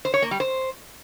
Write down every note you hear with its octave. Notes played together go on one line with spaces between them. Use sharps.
C5
C#5
A#3
G3
C5